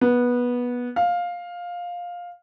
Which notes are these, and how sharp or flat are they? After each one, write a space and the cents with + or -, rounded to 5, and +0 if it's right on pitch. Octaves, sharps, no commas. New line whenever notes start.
B3 -15
F5 +10